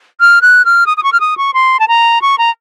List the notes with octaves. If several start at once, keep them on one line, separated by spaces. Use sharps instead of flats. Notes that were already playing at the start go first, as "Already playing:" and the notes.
F6
F#6
F6
D#6
D#6
C#6
F6
D#6
C#6
C6
A5
A#5
C#6
A#5